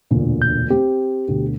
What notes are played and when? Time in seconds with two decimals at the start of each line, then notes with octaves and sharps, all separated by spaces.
0.11 E1 D2 A#2
0.42 G6
0.71 C4 G4
1.28 D2 B2